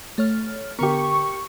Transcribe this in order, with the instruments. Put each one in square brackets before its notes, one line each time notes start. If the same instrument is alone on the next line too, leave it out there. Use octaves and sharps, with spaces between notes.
[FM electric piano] A3 C#5 F6
[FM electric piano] D3 B3 [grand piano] G4 A#4 [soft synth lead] C#6